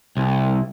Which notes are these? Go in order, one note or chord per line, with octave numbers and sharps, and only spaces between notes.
C2